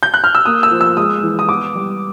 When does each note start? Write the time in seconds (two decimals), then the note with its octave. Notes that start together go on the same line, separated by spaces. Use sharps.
0.03 G6
0.14 F#6
0.24 F6
0.35 E6
0.46 A#3 D#6
0.63 E6
0.71 F3
0.81 E6
0.97 G#3 D#6
1.23 E3
1.39 D#6
1.49 B3 D6
1.75 G3